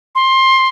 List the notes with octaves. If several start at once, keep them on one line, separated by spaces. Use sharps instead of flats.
C6